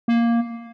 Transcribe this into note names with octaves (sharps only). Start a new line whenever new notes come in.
A#3